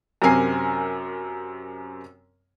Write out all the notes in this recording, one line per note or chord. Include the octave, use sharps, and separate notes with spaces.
F#2 C3 C4 A#4 G#5 C7